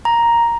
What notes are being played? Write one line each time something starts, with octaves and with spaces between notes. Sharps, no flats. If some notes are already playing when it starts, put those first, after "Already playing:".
A#5